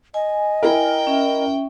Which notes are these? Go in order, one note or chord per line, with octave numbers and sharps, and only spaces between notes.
D#5 G#5
E4 A#4 G5
C#4 E5